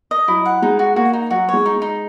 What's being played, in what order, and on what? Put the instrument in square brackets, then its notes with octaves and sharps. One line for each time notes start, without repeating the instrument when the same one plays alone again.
[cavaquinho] D#5
[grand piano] F#3 [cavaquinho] E4
[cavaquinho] F#5
[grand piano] G#3 [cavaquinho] D#4
[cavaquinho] F#4
[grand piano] A#3 [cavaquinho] F#4
[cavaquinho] D#4
[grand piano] F#3 [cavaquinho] F#4
[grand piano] G#3 [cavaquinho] C#5
[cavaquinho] D#4
[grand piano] G#3
[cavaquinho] D#4